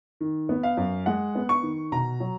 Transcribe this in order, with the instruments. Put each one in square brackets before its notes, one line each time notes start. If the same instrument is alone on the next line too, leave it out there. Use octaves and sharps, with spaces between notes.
[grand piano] D#3
B3
F5
F#2
G#3 F#5
B3
C#6
D#3
B2 A#5
F#3